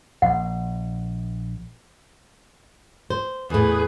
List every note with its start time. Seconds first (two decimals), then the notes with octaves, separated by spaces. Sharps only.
0.22 A#1 F#5
3.10 C5
3.50 E2 A2 G#4 B4